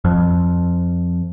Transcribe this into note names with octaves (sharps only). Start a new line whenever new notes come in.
F2